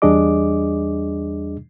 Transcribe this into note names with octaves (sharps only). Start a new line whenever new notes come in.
E2 G3 D4 G#4 D#5 D6